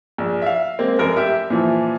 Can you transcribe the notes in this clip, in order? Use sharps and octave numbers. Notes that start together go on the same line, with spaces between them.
A#1
E5 F5
G#3 A#3 C4
F1 F#2 A#4
G4 E5
A#2 E3 F3